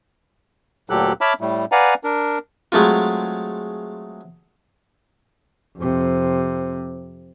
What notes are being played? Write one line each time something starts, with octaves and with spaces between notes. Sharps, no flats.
D2 A#2 F#3 G4 A4 F#6
C#5 E5 A5 B5 D6 F6
A2 G3 A3
B4 D5 F5 F#5 G#5 A#5
D4 A#4
F#3 G#3 A3 C4 F4
F2 C3